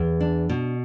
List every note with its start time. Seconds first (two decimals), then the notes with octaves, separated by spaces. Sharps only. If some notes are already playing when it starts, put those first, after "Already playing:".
Already playing: E2
0.20 D4
0.49 B2